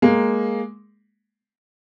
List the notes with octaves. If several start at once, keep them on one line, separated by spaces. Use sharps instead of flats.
G#3 A#3